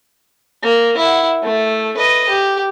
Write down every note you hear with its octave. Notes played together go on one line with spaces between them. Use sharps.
A#3
E4 F#5
A3
B4 D#5
G4